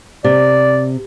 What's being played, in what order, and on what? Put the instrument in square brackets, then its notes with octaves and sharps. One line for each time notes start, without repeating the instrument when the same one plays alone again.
[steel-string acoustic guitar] C3 [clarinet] D5